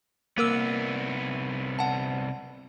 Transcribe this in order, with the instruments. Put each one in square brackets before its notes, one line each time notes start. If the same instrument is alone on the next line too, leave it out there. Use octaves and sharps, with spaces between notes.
[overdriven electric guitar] C2 B3 [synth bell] A#3 A#4 E6
[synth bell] F#5 A5